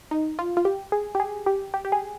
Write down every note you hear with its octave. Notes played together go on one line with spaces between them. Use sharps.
D#4
F4
F4
G4
G#4
G4
G#4
G4
G4
G4
G#4